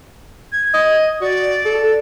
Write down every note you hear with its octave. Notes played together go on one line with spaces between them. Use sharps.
G#6
D#5
F#4 D5
A4